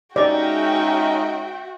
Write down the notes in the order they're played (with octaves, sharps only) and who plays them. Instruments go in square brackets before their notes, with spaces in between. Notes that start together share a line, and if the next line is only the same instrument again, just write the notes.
[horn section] G#3 C#4 D#4 [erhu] F#4 [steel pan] D5 [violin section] E5 G5